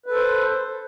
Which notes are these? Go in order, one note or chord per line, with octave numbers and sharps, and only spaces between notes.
A4 B4 C5